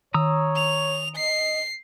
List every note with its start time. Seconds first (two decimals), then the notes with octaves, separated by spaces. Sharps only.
0.14 D#3 C#5 A#5 D#6 E6
0.56 F7
1.16 D#5 C7